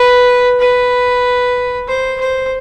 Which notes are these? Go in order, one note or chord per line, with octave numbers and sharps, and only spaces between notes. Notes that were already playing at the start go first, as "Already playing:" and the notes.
Already playing: B4
B4
C5
C5